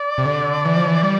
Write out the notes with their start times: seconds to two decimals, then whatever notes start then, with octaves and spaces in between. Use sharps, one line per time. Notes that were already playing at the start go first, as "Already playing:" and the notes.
Already playing: D5
0.18 C3
0.26 D3
0.65 E3
0.76 F3
0.87 E3
1.03 G3 D5